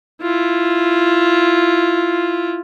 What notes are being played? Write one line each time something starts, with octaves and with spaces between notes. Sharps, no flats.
E4 F4